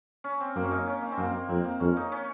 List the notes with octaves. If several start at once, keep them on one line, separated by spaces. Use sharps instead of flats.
C#4
C4
F#2 A#3
C#4
D#4
C#4
A#3
C4
F#2 A#3
A#3
F2 C4
A#3
F2 C#4
D#4
C#4